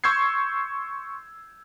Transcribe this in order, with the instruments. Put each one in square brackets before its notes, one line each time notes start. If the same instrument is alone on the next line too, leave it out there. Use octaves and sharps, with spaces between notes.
[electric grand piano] C6 C#6 E6 G6 G#6 C7